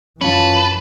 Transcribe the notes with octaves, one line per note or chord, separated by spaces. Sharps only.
F#2 E3 C#4 F4 B4 A5